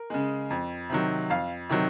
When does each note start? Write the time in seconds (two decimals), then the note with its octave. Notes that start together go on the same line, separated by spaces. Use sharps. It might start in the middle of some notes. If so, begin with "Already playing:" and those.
Already playing: A#4
0.10 C#3 G#3
0.50 F2
0.90 C3 D#3 F#3
1.30 F2 F5
1.69 C3 D#3 F#3